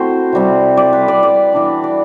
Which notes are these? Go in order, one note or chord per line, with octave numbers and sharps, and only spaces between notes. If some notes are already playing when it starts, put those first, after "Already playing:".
Already playing: A3 C4 E4 F#4 C5
C3 G3 C4
D5
B4
D5
D5
E3 B3 D4
D5